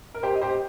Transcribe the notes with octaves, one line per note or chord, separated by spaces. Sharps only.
A#4
G4 C5
D#5
G4 C5